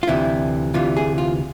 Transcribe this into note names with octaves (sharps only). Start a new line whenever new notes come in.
F4
D2 C3 E3 E4
D2 C3 E3 F4
G#4
F4